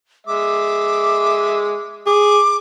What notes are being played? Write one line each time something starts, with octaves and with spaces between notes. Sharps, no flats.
G#3 E5 D6
G#4 D6